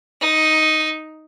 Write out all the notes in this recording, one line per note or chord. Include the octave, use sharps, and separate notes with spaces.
D#4